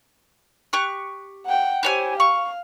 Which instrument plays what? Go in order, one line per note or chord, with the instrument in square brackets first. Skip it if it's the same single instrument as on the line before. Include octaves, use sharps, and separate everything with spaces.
[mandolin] G4 C#6 F#6
[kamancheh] F#5 G5
[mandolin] E4 C#5 G#5 [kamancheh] G4 C5
[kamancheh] F5 [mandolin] C#6